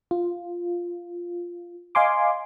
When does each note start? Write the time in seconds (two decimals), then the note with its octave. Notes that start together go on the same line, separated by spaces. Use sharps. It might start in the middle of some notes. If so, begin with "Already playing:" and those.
0.11 F4
1.95 D#5 F5 G#5 C6 D6